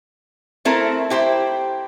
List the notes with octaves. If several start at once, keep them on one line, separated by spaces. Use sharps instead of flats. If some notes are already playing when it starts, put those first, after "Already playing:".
A3 C4 E4 A4 A#4
E4 G4 C5